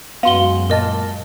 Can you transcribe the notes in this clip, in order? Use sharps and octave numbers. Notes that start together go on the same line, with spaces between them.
F#2 G#3 B3 F#4 F5 C6 G7
A#2 A#4 D#5 A5